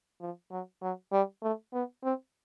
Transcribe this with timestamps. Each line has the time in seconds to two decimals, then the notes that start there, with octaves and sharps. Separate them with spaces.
0.21 F3
0.51 F#3
0.82 F#3
1.12 G3
1.43 A3
1.73 B3
2.04 C4